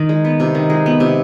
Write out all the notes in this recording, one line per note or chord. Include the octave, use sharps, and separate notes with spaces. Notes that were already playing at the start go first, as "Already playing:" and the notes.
Already playing: D#3
G#3
B3
C3
D#3
G#3
B3
C3